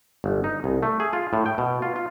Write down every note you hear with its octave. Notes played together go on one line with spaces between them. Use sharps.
G1
D#4
C2
A3
G#4
F4
A2
G5
B2
F4
F4